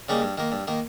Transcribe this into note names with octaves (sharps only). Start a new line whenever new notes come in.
C#3 G3 A#3 D#4
G2
D#3 A#3
G2
D#3 A#3